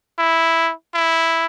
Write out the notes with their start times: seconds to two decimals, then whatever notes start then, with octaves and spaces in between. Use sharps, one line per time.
0.19 E4
0.94 E4